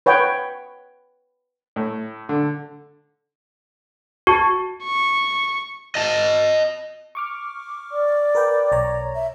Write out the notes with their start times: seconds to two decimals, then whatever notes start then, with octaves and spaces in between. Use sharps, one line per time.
0.06 B4 C#5 F#5 G5
1.76 A2
2.29 D3
4.27 F#4 A5 C#6
4.84 C#6
5.95 D#5 A5
7.15 C#6 D6 F6
7.92 D5
8.35 A#4 B4 G5
8.72 B1 C#5 A#5
9.15 E5